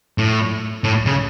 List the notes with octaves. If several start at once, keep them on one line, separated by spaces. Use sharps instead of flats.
A2
A2
C#3